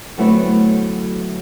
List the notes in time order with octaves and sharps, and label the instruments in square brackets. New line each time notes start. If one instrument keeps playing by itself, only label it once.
[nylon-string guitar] D2 F#3 A3 B3 C4 E4